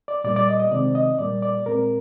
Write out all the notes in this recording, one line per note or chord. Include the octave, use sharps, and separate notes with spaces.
D5
A#2 G3 A#3 D5
D5
D#5
D#5
C3 D#3 G#3 C4 D5
D#5
A#2 G3 A#3 D5
D5
A#2 G#3 C4 A#4